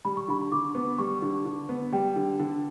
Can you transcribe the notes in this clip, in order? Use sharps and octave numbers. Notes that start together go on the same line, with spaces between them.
G3 B5
C#6
D3 B5
D3 D6
B3
G3 C#6
D3
D3
B3
G3 G5
D3
D3